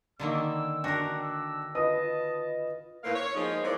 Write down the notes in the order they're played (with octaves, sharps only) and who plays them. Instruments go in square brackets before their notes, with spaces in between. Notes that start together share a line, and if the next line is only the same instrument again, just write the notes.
[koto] D3 D#3 A#3 [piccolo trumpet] E6
[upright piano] D4 A#6 [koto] F#4 A#4 [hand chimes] G5 D6 F#6
[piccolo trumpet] E6
[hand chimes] F4 B4 [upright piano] D#5 D#6 [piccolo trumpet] A5
[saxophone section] A2 A#3 B4 C5 F5
C#5
F3 G#3 A#3 B3 D#4 C5
E3 F3 G#4 A#4 C#5 D5